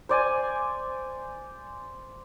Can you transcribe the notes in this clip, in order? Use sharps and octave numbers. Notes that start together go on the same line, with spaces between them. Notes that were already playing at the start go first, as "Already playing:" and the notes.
C5 D5 G#5